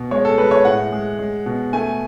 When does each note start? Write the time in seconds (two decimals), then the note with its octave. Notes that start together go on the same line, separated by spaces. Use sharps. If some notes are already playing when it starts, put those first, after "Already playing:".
Already playing: B2
0.11 G#3 C#5
0.25 A4
0.38 G#3 B4
0.51 C#5
0.65 A2 F#5
0.92 G#3
1.19 G#3
1.46 B2
1.73 A3 G#5